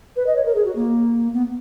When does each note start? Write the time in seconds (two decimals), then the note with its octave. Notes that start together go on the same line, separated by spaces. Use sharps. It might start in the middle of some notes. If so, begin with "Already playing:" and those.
0.16 B4
0.27 D#5
0.36 C#5
0.45 A#4
0.55 G#4
0.65 F#4
0.75 A#3
1.33 B3